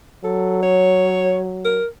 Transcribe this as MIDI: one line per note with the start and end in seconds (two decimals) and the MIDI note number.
0.24 1.80 54
0.24 0.60 69
0.63 1.41 73
1.65 1.86 70